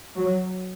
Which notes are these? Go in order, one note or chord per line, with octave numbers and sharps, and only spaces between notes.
F#3